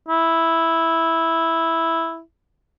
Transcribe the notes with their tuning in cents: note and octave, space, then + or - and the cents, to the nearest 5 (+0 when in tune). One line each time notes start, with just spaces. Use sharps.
E4 -5